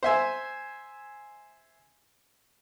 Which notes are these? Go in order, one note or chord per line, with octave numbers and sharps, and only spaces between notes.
C5 E5 G#5